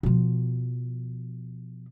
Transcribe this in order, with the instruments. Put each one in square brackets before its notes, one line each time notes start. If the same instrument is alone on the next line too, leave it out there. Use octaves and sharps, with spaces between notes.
[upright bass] B2 F3